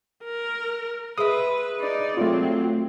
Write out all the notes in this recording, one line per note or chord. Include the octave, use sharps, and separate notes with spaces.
A#4
G#3 B4 E5 D#6
D#4 D5
F#3 A3 C4 F4